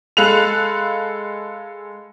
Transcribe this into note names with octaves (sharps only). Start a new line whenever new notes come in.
G#3 A4 F5 B5 F#6 F7